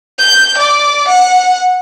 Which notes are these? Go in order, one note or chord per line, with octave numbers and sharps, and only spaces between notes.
G6
D5
F#5